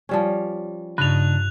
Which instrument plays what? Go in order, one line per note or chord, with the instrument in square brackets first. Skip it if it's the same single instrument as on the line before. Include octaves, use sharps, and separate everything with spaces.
[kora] F3 G3 C#4
[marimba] G2 [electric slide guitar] C#3 D4 D#4 [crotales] F#6 F7